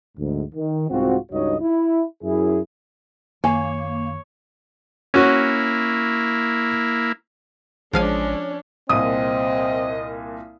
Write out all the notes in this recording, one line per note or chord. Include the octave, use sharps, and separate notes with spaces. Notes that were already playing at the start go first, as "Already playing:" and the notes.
D2 G#2
D#3
C2 G#2 C4 F4 F#4
C#2 G2 D#4 F#4 C#5 D#5
E4
F#2 E4 G#4
F#2 D#3 A#3 C#5 G#5
A#3 C#4 E4 F#4
A1 F3 G#3 C#4 D4 F5 G#5
C2 A#2 C4 D#5 D#6